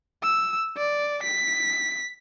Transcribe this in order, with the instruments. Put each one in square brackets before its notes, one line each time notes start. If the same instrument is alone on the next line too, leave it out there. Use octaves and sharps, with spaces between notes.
[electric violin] E6
D5
B6